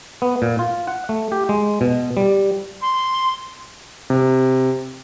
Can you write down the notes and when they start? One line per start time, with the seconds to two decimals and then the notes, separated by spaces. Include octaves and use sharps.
0.22 B3
0.42 A#2
0.59 F4
0.88 F#5
1.09 A3
1.32 G4
1.49 G#3
1.81 B2
2.17 G3
2.81 C6
4.10 C3